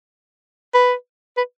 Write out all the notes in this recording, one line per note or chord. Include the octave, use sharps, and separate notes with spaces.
B4
B4